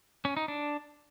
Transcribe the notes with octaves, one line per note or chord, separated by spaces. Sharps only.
C#4
D#4
D4